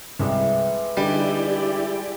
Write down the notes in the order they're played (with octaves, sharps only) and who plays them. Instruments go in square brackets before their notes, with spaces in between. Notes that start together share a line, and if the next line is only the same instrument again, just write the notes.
[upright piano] C2 [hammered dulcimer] E3 G3 G#3
[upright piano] D3 D#4 [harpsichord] G3 [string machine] E4 G4 D5 [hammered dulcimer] G#4